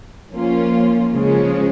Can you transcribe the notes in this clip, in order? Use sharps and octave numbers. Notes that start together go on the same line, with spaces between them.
F3 A#3 C#4 F4
C#3 F3 G#3 C#4